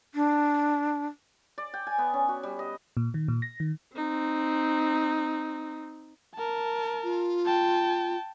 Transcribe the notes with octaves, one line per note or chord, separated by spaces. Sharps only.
D4
D5
G5
G#5
B3
C#4
F#4
G3
D#5
A#2
D#3
A#2
A#6
D#3
C4 D#4
A#4 A5
F4
G5 A5